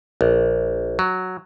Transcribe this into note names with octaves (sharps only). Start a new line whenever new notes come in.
A#1
F#3